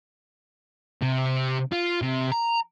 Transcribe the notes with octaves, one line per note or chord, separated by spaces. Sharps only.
C3
F4
C3
A#5